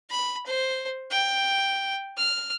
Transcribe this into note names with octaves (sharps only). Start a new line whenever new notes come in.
B5
C5
G5
F6